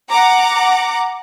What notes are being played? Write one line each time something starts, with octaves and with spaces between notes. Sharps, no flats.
F#5 A#5 D6